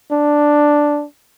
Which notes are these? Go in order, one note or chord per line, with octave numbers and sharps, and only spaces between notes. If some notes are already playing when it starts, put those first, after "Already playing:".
D4